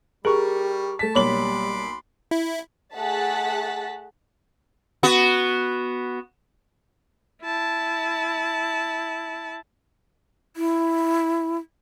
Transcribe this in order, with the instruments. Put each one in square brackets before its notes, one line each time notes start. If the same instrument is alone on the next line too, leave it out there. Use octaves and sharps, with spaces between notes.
[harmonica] G3 [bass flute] G4 [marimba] G#4 [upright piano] A#4 C#6
[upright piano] A3 B6 [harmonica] A5
[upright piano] B1 A#3 F#7 [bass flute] G3 [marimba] C#5 [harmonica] B5 C6 D6
[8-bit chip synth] E4
[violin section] A3 G#4 F#5 A5 A6 B6
[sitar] B3 F#4
[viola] E4 A5
[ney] E4